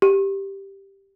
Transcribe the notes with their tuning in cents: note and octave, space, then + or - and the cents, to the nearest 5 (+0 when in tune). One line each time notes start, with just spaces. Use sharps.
G4 +0